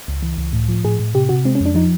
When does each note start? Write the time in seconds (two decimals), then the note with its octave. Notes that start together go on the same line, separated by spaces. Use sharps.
0.08 C#2
0.23 E3
0.38 C#2
0.53 A2
0.68 F3
0.84 A2 G#4
0.99 A2
1.14 C3 G4
1.29 C3 F#4
1.45 G#3 C4
1.55 C#4
1.61 F2 D4
1.75 F3 D#4